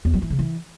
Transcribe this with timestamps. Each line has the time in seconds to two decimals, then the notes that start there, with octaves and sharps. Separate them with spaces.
0.05 E2
0.13 G3
0.22 E3
0.30 C#3
0.39 E3